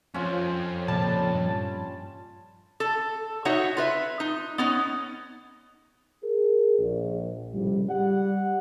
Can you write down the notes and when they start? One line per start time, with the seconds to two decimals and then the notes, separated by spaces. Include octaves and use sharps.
0.14 F2 C#4 F4
0.88 A#2 C#3 G3 A#3 A5
1.35 G2
2.80 A4
3.45 D#4 F#4 C#5 E5 F#5
3.77 F4 B4 E5
4.20 D#4
4.58 B3 C#4 D#4
6.23 G#4 A#4
6.78 A#1
7.53 C2 F2 A2 C#3 G3
7.88 G3 F#5